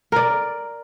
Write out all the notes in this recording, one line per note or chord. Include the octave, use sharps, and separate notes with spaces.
A#4 D5